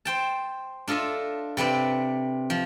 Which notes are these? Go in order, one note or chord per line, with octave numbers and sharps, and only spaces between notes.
C5 G5 A5
D4 F4 A4 D#5 E5
C3 C4 B4 D5
F3